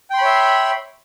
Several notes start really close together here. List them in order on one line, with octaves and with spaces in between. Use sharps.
G5 C6 B5 C#5 E5